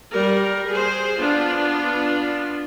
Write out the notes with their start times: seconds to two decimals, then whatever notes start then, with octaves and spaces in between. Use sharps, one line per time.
0.11 G3 A#4
0.69 G#4 C5
1.17 B3 D4 F4